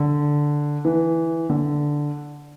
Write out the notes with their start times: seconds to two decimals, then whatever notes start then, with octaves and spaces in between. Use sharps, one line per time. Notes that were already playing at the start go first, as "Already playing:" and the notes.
Already playing: D3
0.85 E3
1.49 D3